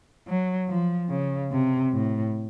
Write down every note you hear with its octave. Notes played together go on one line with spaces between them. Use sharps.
F#3
F3
C#3
C3
A2